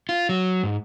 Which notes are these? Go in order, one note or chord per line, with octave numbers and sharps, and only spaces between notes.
F4
F#3
G#2